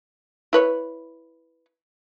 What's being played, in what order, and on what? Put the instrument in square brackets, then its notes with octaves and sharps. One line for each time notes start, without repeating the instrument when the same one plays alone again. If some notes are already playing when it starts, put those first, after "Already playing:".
[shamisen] E4 B4 C#5